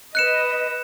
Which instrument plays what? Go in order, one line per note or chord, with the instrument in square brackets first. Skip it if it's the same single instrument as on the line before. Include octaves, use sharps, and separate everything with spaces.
[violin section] B4 D#5 [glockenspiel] F#6 C#7 E7